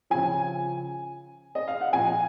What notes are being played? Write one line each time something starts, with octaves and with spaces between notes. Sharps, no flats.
C#3 F3 G#5
D#5
F5
F#5
A#2 F3 G#5